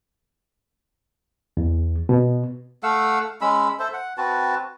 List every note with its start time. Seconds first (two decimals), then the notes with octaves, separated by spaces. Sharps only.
1.57 E2
2.09 B2
2.83 A3 F5 F#5 E6
3.41 G#3 C#4 B5 E6
3.79 A4 C5 E5
3.93 F#5
4.18 C4 F#4 B4 A5